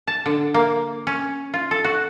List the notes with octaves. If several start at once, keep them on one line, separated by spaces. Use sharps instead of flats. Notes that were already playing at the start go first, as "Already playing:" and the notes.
A5
D3
A#3
C#4
F4
A4
F#4